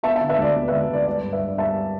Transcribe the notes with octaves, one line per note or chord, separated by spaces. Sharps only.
B3 E5 A5
E5 A5
D3
B4 E5
D2 D5
B3
D2 B4 E5
D2 D5
G3 D5
G2
B4 E5
G2
G3 E5 A5